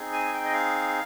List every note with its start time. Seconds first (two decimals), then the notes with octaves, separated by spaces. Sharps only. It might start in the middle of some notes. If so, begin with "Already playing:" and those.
Already playing: C4 D#4 G#4
0.13 G#5
0.34 G5
0.44 D#5
0.53 F5